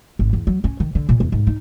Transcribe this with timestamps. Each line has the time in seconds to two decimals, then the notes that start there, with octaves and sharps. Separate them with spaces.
0.19 G#1
0.33 E2
0.47 F#3
0.64 C#4
0.80 D#3
0.95 D3
1.09 A#2
1.20 E2
1.32 G#2
1.47 D#4